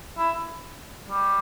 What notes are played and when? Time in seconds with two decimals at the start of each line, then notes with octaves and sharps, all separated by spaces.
0.18 E4
1.09 G3